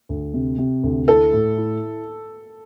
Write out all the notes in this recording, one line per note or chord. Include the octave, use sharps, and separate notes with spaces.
D2
C3
C3
D2
E4 A4
A2
E4